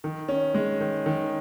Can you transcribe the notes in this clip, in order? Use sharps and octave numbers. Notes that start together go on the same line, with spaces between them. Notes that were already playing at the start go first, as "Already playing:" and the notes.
D#3
C#4
G#3
D#3
D#3